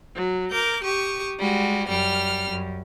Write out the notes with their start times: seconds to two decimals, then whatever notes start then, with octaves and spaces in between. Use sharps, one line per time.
0.15 F#3
0.51 A#4 D6 G6
0.84 G4 C#6 D#6
1.40 G3 G#3 F#4
1.88 F#2 G3 F6
2.50 F#2